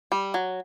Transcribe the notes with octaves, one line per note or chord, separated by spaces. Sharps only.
G3
F#3